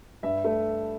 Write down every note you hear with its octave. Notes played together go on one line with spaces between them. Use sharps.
G2 E5
A3